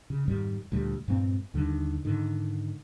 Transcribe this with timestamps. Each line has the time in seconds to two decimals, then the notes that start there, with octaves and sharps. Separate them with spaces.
0.10 C#3
0.28 F2 G#2 D#3 G3
0.72 D2 A#2 G3
1.08 G2 A#2 G#3 C4
1.54 D#2 D3 D#3 G3
2.05 G#2 D3 D#3